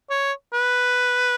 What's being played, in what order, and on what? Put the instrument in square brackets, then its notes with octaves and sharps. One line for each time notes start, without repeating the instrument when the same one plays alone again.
[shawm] C#5
B4